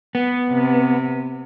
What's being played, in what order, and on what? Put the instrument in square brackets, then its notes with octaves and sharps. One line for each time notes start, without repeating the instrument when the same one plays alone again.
[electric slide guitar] B3
[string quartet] C3